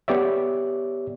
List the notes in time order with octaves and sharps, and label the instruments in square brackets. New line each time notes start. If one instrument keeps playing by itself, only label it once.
[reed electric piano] B3 G4 C#5 D5 E5